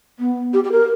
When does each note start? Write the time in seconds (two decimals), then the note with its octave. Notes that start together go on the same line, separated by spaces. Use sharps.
0.19 B3
0.53 G4
0.64 G4
0.72 A#4